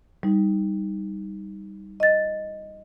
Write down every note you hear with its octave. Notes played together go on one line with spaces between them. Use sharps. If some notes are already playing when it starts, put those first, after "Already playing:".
G3 D#4
D#5 A6